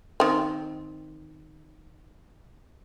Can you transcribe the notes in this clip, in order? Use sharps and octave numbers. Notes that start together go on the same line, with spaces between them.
D#3 C4